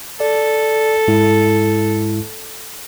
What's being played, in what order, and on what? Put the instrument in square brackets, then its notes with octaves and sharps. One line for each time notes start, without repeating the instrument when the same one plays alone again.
[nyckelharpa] A4 [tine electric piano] D5
[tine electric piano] G#2 G#3 E4